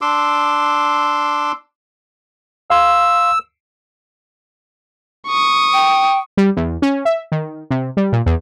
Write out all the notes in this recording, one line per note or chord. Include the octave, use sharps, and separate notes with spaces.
D4 C6 D6 E6
F5 C6 E6
C#6 D#6
G5
G3
E2
C#4
E5
D#3
C3
G3
A#2
E2